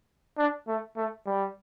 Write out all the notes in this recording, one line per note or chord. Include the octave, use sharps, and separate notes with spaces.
D4
A3
A3
G3